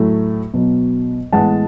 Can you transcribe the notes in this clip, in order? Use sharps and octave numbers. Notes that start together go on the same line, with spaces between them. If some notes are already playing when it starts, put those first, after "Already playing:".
Already playing: A2 F#3 A3
B2 F#3 B3
A2 E3 G#3 B3 F#5 A5